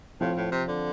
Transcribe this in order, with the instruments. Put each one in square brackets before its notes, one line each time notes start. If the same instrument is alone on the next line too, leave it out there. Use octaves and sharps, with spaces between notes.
[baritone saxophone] A2 [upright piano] F3 C4 F4
[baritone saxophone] A2
C3
D3